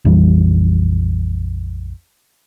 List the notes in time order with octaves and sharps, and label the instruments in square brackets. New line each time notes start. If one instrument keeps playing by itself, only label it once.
[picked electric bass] A#1 F2 E3 G3